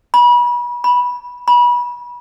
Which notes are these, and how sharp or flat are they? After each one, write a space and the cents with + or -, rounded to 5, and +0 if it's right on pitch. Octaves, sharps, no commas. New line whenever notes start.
B5 -35
B5 -15
B5 -30